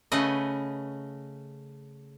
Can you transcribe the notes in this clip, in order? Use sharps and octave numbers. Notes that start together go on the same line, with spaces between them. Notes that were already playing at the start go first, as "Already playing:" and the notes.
C#3 A3 C#4 B4 D#5